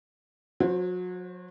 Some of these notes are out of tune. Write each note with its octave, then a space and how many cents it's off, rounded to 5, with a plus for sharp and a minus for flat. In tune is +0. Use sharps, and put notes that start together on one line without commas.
F#3 -35 C5 +0